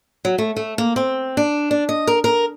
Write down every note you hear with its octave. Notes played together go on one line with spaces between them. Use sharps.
F#3
A3
A3
A#3
C4
D4
D4
D#5
A#4
A#4